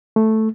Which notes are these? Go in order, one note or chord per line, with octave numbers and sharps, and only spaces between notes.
A3